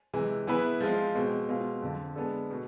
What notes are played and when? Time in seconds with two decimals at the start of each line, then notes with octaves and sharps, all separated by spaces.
0.13 C3 E3 G#3
0.47 E3 B3 E4 G#4 B4
0.80 F3 G#3 C4 F4
1.15 B2 G#3 C4
1.48 B2 G#3 C4 F4
1.82 F2 D3 F3
2.15 G#3 B3 D4 A4
2.50 B2 A3